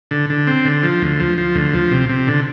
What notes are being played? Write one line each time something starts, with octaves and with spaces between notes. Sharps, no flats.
D3
D3
C4
D3
F3
D2
F3
F3
D2
F3
C3
C3
D3